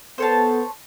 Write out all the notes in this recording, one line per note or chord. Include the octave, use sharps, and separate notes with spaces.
B3 A4 C5 C#5 A5